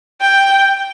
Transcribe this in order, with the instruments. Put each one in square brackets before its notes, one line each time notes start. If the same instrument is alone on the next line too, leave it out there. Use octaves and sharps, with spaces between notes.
[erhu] G5